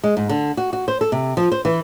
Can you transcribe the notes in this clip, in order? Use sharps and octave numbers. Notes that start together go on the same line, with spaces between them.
G#3
G#2
D3
F#4
F#4
C5
A4
C3
F3
C5
E3